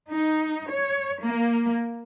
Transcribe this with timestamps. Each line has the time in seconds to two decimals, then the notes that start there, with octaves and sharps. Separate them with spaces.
0.10 D#4
0.70 C#5
1.22 A#3